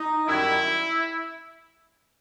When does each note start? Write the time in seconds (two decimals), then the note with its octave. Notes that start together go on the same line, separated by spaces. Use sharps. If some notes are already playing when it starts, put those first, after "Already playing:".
Already playing: D#4
0.27 F#2 D#3 G3 E4